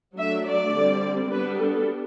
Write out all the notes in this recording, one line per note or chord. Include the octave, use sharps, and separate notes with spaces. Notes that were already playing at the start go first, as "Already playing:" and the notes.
F#3 A3 D4 E5
D5
D3 G3 C4
G3 B3 D4 B4
A4